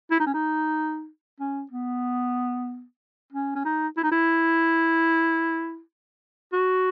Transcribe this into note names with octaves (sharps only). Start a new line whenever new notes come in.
E4
D#4
C#4
D#4
C#4
B3
C#4
C#4
D#4
E4
D#4
E4
F#4